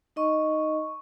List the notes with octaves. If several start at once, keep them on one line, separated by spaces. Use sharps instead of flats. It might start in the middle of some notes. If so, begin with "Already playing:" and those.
D#4 D#5 C#6